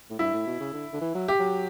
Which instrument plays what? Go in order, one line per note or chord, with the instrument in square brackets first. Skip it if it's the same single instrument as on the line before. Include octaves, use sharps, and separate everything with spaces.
[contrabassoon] A2
[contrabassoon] G2 [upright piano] E4
[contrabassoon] A2
B2
C#3
D3
D3
E3
F#3
[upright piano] G4
[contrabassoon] F#3